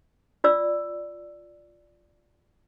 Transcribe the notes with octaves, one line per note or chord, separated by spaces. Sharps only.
F4 D5 E6